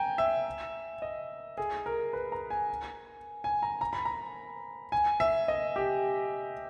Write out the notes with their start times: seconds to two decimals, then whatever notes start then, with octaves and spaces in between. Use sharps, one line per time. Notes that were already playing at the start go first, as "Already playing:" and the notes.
Already playing: G5 G#5 A#5
0.18 E5
1.02 D#5
1.58 G#4
1.86 A#4
2.13 B4
2.32 A#5
2.50 G#5
3.44 G#5
3.62 A#5
3.81 A#5
3.93 B5
4.05 A#5
4.92 G#5
5.20 E5
5.48 D#5
5.76 G4